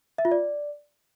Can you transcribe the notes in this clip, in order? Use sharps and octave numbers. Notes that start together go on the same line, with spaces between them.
E5
F4
D5